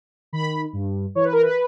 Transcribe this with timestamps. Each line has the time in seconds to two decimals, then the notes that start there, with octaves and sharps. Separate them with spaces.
0.33 D#3 B5
0.73 G2
1.15 E3 C#5
1.24 B4
1.33 A#4
1.42 B4